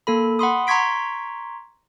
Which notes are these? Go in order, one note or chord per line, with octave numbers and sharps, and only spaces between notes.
A#3 A4 B5
F#5 B5 C6 D#6
A#5 C6 C#6 G#6 B6 D7